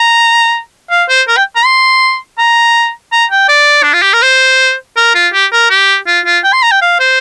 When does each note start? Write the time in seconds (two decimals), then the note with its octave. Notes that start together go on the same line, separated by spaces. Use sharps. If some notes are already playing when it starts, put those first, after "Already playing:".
Already playing: A#5
0.91 F5
1.09 C5
1.28 A#4
1.37 G5
1.56 A#5
1.65 C6
2.38 A#5
3.12 A#5
3.31 G5
3.48 D5
3.82 D4
3.93 F4
4.02 G4
4.13 A#4
4.22 C5
4.97 A#4
5.15 F4
5.33 G4
5.52 A#4
5.70 G4
6.07 F4
6.26 F4
6.44 G5
6.53 C6
6.63 A#5
6.71 G5
6.82 F5
7.00 C5